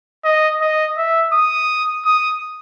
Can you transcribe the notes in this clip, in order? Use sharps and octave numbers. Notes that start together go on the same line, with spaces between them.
D#5
D#5
E5
D#6
D#6